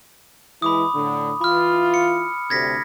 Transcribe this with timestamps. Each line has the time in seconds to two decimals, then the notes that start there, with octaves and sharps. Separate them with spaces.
0.62 E3 G#3 E4 B5 D6 D#6
0.95 A2 D3
1.41 E3 F4 B5 F6
1.94 C#7
2.50 D2 C3 G#6 A#6 B6